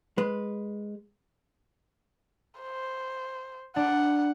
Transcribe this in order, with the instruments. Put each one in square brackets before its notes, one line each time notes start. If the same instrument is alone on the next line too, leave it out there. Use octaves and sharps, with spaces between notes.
[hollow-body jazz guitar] G#3 B4
[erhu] C5
[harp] D4 [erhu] F#5